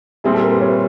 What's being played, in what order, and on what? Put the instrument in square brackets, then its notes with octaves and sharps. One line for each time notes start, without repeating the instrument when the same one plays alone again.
[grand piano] A#2 G3 C4 E4 [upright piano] G#4
[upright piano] A4
A#4
B4
C#5
B4